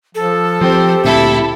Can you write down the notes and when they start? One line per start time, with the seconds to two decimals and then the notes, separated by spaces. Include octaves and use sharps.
0.15 F3 A4
0.61 F3 C4 G4
1.04 D2 A#2 C4 E4 A4 E5